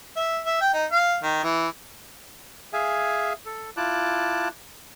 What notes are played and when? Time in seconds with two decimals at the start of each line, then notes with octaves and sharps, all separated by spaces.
0.16 E5
0.46 E5
0.61 G5
0.74 D#4
0.92 F5
1.23 D#3
1.44 E3
2.73 G#4 E5 F5 G#5
3.46 A4
3.77 E4 F4 A5 D6 F#6